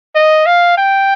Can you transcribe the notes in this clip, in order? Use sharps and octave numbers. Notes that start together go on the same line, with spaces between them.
D#5
F5
G5